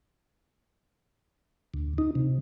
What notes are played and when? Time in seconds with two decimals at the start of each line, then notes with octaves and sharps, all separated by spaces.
1.74 D2
1.98 D#4
2.15 C3